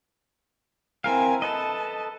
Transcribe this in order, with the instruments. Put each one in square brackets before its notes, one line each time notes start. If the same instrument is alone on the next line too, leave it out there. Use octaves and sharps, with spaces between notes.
[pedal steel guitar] C4 A#4 F5 [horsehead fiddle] E4 G#5
[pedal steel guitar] A4 B4 D#5 [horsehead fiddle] A5